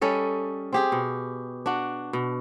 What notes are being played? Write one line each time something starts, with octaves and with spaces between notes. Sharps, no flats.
G3 C#4 A4 D#5
C4 G4 G#4
B2
D4 F#4
B2